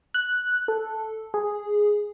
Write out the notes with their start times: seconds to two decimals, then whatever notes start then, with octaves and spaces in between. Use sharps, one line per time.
0.14 F#6
0.68 A4
1.34 G#4